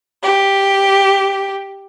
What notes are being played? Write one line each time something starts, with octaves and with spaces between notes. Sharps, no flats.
G4